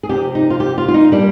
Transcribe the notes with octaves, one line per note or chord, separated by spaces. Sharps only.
G#4
C3 F3 C4 G4
D#4
F4
G4
F4
F4
D#4
G3 A#3 D4